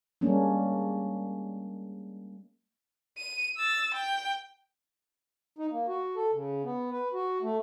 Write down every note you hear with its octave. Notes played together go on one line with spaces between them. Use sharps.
G3 G#3 A#3 C#4 D4
D#7
E6 A6
G5
D#4
A#3
F#4
A4
C#3
B3
B4
F#4
A3